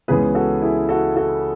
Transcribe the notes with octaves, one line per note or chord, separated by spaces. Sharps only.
C#2 C#3 E3 G#3 B3 G#4 B4
F#4 A4
E4 G#4
F#4 A4
F#4 A4